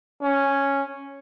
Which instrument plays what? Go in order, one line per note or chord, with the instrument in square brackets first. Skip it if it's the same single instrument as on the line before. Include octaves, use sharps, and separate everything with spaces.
[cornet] C#4